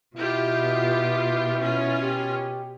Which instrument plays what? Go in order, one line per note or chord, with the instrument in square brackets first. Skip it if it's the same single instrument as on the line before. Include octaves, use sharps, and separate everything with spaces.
[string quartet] B2 [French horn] E4 [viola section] F4 G4
[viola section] C#4 F4
[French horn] G4